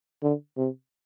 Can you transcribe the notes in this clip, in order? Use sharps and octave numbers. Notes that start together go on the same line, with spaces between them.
D3
C3